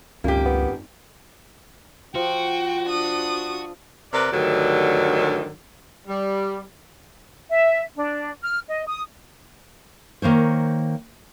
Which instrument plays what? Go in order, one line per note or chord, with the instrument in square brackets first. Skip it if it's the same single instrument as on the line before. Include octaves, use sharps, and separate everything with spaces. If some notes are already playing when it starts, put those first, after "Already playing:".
[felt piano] G#1 F#2 F4 [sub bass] C#2 [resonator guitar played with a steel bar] A#3 G4
[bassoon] B3
[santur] F3 [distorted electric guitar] F#4 [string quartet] G5
[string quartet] D4 D#6
[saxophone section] C3 A#4 B4 D5
D2 G2 D3 D#3 F#3
G3
[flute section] E5
D4
F6
D#5
D#6
[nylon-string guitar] D#3 A#3 C5 C#5